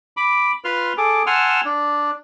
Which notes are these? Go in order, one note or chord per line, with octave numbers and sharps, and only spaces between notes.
B5 D6
F4 B4 C6 F6
G#4 A4 D6
F#5 G#5 A5 C6 E6 F6
D4